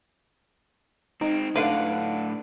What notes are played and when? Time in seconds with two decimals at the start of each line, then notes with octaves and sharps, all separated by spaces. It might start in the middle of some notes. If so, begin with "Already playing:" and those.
1.21 G#3 C4 D#4
1.56 A2 D3 D4 B4 F5 F#5